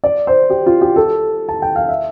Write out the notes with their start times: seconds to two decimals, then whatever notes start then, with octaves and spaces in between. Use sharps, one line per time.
0.04 D5
0.27 C5
0.50 G4
0.66 F4
0.81 G4
0.96 A4
1.49 A5
1.62 G5
1.76 F5
1.88 E5